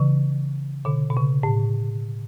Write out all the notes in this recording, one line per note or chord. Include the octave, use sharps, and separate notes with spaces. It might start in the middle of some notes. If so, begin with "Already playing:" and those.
Already playing: C#3 E3
B2 D3
B2
C#3
A2